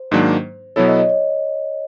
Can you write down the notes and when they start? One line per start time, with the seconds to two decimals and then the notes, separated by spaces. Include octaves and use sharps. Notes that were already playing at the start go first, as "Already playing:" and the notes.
Already playing: C5
0.11 G#2 D#3 F#3 A#3 D4
0.76 B2 F#3 B3 E4 A4 C#5
0.87 D#5
0.98 D#5
1.09 C#5